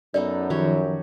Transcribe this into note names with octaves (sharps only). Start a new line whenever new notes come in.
F#2 B3 D#4 A4 D5
D#3 F3 F#4 G4 C#5